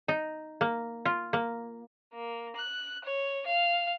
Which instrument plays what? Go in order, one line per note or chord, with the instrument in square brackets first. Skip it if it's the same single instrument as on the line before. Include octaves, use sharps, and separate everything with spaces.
[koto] D#4
A#3
F4
A#3
[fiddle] A#3
F#6
C#5
F5